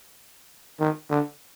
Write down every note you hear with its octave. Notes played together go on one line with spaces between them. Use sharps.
D#3
D3